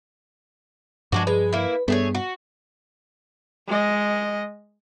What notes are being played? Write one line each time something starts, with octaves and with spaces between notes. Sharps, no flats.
G2 F3 G#3 D4 F#4
G#3 B4
A#3 E4
G2 A3 B3 G#4 C#5
F#4
G#3 D#5